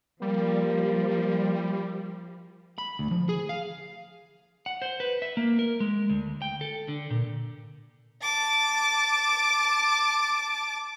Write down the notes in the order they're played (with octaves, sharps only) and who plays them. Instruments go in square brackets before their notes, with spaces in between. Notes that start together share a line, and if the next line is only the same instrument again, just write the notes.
[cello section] F3 [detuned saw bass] G3 [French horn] A#3
[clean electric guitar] B5
D2
F3
G#4
F5
F#5
C5
B4
E5
A#3
A#4
G#3
D2
G5
A4
D3
A#2
[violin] A5 D6